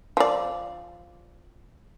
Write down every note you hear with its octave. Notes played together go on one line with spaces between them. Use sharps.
F3 D5